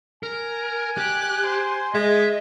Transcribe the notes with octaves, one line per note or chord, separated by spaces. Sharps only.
A#4 G#5
G4 F#6
C5
G#3 D#5 E5